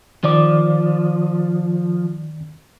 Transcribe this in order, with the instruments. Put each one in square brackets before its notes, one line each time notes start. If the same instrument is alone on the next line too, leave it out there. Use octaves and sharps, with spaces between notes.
[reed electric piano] D#3 D5 D6 [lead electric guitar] F3